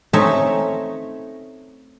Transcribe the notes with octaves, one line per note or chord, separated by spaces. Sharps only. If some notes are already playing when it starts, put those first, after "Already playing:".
A3 C4 C#4 D#4 C#5 E5